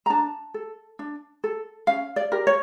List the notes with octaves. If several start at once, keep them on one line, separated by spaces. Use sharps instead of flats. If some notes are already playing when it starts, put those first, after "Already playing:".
A#5
D4 A5
A4
D4
A4
C#4 F5
D5
G4 A#4
C#5